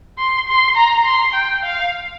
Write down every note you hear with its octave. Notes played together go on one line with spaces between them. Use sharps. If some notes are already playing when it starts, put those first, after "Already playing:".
C6
C6
A#5
C6
G5
F5